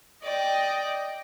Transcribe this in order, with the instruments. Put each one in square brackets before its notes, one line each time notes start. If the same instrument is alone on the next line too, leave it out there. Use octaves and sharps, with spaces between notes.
[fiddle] D5 [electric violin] D#5 G5